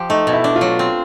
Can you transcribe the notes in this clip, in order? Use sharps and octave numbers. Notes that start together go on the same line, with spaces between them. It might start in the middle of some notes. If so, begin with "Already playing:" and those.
Already playing: F3 G4
A3 D#4
B2
E4
D4
F4
F#3
C4